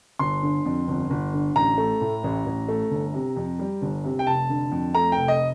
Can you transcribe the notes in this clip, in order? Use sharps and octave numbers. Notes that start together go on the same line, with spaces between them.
G1 C6
D3
F2
G1
G1
D3
A1 A#5
A3
A2
A1
A1
A3
G1
C3
F2
G3
G1
C3
G5
F1 A5
D3
F2
A3 A#5
F1 G5
D#5